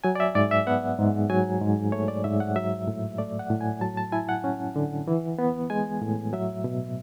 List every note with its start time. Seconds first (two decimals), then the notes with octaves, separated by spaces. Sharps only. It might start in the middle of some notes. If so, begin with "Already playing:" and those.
0.04 F#3 G#5
0.15 D5
0.20 E5
0.35 G#2 D5
0.51 E5
0.67 B3 F#5
0.98 G#2
1.30 F#3 G#5
1.61 G#2
1.92 A3 C#5
2.08 D5
2.24 G#2 E5
2.40 F#5
2.56 F#3 E5
2.87 A2
3.18 A3 D5
3.39 F#5
3.50 A2
3.61 G#5
3.81 F#3 A5
3.97 A5
4.12 E4 G#5
4.29 F#5
4.44 C#4
4.76 D3
5.08 E3
5.39 B3
5.70 G#3 G#5
6.02 A2
6.33 F#3 E5
6.64 B2